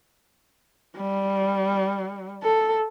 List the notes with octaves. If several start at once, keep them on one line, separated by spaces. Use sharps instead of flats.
G3
A4